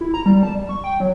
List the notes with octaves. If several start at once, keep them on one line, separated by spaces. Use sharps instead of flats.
E4
A#5
G3
A5
G3
C#6
G5
F#3